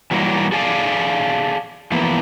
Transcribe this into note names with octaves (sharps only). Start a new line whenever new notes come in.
E3 F#3 G3 A#3 A#4
G#4 A4 D5 F5 G#5
E3 F3 A#3 B3